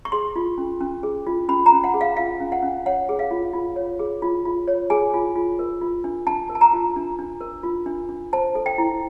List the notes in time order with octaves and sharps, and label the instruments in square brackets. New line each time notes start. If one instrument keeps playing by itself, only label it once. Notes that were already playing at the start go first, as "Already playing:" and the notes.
[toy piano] C#6
G#4 C6
F4
C#4
C#4
G#4
F4
C#4 B5
A#5
C#4
F#5
G#4
F5
F4 F5
C#4
F#5
C#4
C#5 F#5
G#4
F5
F4
F4
C#5
G#4
F4
F4
C#5
G#4 G#5
F4
F4
A#4
F4
D4
D4 A5
A#4
A5
A#5
F4
D4
D4
A#4
F4
D4
D4
C5 A5
A4
G5
E4